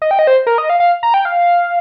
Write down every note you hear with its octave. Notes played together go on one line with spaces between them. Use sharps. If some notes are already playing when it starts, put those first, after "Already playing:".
D#5
G5
D#5
C5
A#4
D#5
F5
F5
A#5
G5
F5